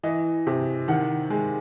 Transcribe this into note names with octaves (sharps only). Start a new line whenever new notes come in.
E3 D#5
C3
D#3 F#5
G#3